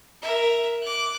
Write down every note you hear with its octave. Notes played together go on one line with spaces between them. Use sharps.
A#4 E5
D6 F#6